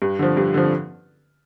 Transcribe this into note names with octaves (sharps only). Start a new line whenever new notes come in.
G2
D3 F3
G2
D3 F3